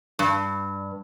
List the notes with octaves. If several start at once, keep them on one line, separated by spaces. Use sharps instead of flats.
G2